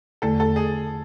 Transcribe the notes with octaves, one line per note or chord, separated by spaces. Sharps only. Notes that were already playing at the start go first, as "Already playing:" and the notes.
E2 D3 A3 A4
A4
G#4